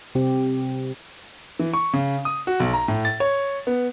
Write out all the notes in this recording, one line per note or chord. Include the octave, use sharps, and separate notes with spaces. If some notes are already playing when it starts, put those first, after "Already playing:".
C3 C4 G4
E3
C#6
C#3
D#6
F#4
B1
A#5
A2
A6
C#5
B3